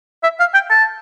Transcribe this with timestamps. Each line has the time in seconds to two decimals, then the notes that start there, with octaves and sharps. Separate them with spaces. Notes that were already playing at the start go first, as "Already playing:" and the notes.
0.23 E5
0.39 F5
0.54 G5
0.70 A5